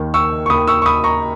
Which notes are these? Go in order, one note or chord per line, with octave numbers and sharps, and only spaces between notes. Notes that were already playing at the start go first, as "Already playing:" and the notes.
Already playing: D#2 D#3
C#6 E6
C#6
D#2 D#3 B5 D#6
C#6 E6
C#6
B5 D#6
A#5 C#6